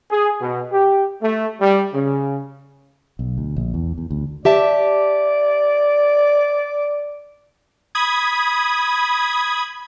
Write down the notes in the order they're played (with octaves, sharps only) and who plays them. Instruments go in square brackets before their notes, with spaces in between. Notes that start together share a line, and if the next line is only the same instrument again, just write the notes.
[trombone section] G#4
B2
G4
A3
G3
C#3
[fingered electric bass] B1
D2
A#1
E2
E2
D2
[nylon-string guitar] G4 E5 A5 [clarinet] D5
[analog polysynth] B5 D#6 G#6